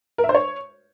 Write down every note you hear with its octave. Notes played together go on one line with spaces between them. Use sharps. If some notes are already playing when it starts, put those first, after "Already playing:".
A#4
E5
C5
C#5